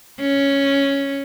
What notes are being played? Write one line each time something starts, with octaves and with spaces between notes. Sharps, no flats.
C#4